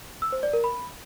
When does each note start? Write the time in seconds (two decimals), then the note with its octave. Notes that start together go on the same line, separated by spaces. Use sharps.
0.22 E6
0.32 C5
0.43 D5
0.53 A#4
0.64 B5